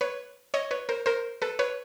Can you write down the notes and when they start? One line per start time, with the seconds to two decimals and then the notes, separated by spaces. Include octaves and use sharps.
0.01 B4 C#5
0.54 C#5 D#5
0.71 B4 C#5
0.89 A#4 C5
1.06 A#4 C5
1.42 A4 B4
1.59 B4 C#5